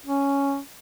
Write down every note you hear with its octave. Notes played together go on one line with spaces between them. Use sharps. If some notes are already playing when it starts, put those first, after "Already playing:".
C#4